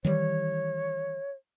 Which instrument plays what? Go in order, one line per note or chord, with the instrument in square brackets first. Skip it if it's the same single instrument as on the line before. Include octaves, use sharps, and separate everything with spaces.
[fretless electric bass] D#3 E3 G3 [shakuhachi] C#5